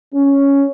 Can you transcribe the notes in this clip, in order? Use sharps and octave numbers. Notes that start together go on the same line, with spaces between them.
C#4